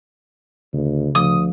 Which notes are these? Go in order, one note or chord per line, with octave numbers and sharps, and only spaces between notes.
D2 C#3
D2 F3 D#6